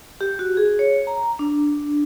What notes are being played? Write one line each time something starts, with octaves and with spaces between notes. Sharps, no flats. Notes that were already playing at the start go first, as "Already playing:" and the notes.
G4
F#4
G#4
C#5
A#5
D4